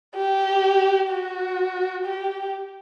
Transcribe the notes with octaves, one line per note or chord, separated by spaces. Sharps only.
G4
F#4
G4